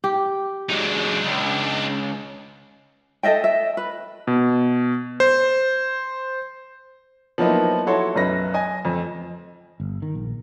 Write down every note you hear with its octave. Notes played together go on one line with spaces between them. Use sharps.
G4
F#3 G#3 D4 D#4
C#2
A4 D#5 E5 G5
E5
B4
B2
C5
F3 F#3 A#3 B3 D#4 E4
E4 F#4 A4 C#5 C6
B1 F#2 B4 A#6
D#5 G#5
F2
G1
D#3
A#1